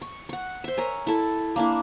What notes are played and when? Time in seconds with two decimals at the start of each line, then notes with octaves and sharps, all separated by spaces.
0.02 C#6
0.29 F#5 C#6
0.64 C5 E5
0.78 A#4 C#5 G#5
1.07 E4 A4
1.56 A#3 D4 E4